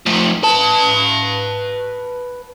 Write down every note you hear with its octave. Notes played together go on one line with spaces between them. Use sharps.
F3 A3
B4 A5